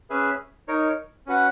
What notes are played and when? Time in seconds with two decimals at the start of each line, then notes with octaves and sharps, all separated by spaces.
0.10 C#4 G#4 B4 E5
0.68 D#4 A#4 C#5
1.27 C#4 F#4 B4 F#5